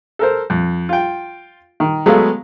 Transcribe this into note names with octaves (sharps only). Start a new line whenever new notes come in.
A4 A#4 C5
F2
F4 G5
D#3
F#3 G#3 A3 B3 A4 F5